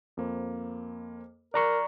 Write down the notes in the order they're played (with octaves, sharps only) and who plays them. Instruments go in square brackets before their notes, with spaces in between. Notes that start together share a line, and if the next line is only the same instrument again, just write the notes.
[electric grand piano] F2 A#3 C5
[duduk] A#4 [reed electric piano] D5 A#5 C#6 [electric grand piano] F#6